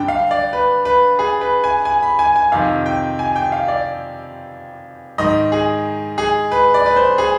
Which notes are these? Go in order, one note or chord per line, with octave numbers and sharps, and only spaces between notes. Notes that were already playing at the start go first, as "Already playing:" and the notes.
Already playing: G2 D3 G5
F5
D5
B4
B4
G#4
B4
G#5
G#5
B5
G#5
G#5
F2 C3 D#3 F5
G5
G#5
G5
F5
D5
G#2 D#3 D#5
G#4
G#4
B4
D5
B4
C5
G#4